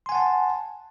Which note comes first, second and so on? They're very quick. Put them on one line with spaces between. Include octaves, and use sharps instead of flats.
C6 G#5 F#5 A5